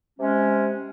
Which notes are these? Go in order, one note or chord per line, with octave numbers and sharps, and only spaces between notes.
C3 G#3 C#4